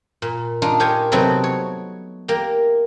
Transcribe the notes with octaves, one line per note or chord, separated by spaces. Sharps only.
A#2
D4 D#4 F4
G4 A#4 C5 C#5 G#5
C3 F#3 A3 B3 C4 D#4
C#5
A#3 G4